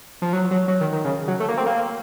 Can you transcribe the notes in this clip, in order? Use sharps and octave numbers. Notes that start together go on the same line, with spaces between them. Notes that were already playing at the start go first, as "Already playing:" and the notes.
F3
F#3
F#3
F#3
D#3
D#3
C#3
F#3
A3
A#3
C4
A#3